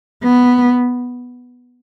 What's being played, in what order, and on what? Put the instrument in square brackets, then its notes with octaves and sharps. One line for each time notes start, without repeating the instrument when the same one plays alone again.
[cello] B3